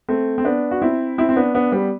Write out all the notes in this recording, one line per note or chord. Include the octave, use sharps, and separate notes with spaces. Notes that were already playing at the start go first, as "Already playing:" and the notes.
A3 C4
C4
B3 D4
F#4
C4 E4
C4 E4
C4
B3 D4
B3 D4
G3 B3